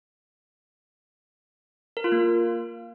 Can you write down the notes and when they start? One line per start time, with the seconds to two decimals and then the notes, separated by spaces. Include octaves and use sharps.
1.97 A#4
2.04 F4
2.12 A#3